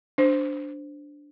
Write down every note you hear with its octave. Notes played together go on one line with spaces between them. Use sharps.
D4 C5